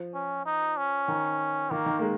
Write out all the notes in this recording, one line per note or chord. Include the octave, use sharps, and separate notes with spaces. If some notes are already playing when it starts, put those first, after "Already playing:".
Already playing: F3
C#4
D#4
C#4
D#3
D#3 A#3
D#3
A#3
G#3